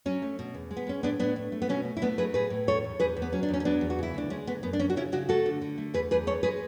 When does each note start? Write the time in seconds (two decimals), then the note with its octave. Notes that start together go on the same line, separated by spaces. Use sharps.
0.06 F#3 C#4
0.22 A3
0.39 B2
0.54 E2
0.71 G#3
0.77 B3
0.87 G#3 C#4
1.03 A2 B3 D4
1.20 A2 B3 D4
1.36 A3
1.52 A3
1.62 B3
1.69 B2 C#4
1.85 A3
1.97 E4
2.02 A3 B3 D4
2.18 F#3 G#4 B4
2.34 A2 G#4 B4
2.50 A2
2.67 E2 A4 C#5
2.84 E2
2.99 E2 G#4 B4
3.17 E2
3.22 B3
3.32 F#3 C#4
3.43 D4
3.49 E2 C#4
3.60 C#4
3.65 F#3 B3 D4
3.81 E2
3.90 F#4
3.98 C#3 E4
4.14 D2 D4
4.30 G#3 C#4
4.47 D2 B3
4.63 F#2 B3
4.73 D4
4.80 F#2 C#4
4.90 F#4
4.96 C#3 C#4 E4
5.12 C#3 D4 F#4
5.29 A3 F#4 A4
5.46 D3
5.62 D3
5.78 A3
5.94 E2 G#4 B4
6.11 E2 G#4 B4
6.27 G#3 A4 C#5
6.43 G#3 G#4 B4